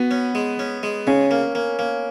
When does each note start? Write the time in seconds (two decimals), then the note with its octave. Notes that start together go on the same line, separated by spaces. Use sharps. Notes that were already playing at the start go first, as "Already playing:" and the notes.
Already playing: B3 F#4
0.11 C#4
0.35 G#3
0.59 C#4
0.83 G#3
1.07 C#3 C#4
1.31 A#3
1.55 A#3
1.79 A#3